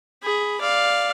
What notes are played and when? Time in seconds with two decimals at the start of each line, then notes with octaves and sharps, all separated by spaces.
0.23 G#4 B5
0.60 D5 F5